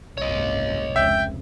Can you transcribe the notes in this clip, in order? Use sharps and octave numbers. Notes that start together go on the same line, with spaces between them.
F#1 C2 G#2 C#5 D#5
F1 C#2 E5 G5